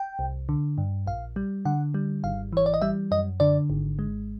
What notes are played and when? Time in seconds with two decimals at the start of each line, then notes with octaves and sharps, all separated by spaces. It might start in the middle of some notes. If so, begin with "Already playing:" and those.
Already playing: G5
0.19 C2
0.49 D3
0.78 G2
1.07 A#1 F5
1.36 G3
1.65 D3 F#5
1.94 G3
2.24 G#1 F5
2.52 E3 C#5
2.66 D5
2.74 D#5
2.82 G3 E5
3.11 F#2 D#5
3.40 D3 D5
3.70 G#1
3.99 G#3